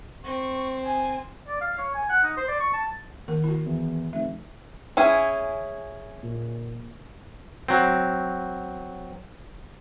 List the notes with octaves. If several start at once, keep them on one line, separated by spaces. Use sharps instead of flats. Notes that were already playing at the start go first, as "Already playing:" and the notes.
C4 C#6
G#5
D5
F5
C#5
G#5
F#5
D#4
C5
D5
C#6
A5
D#3 A#3 A#4
E4 F#4
E2
F1 E5
C#4 E4 G#4
A#2
F#3 C4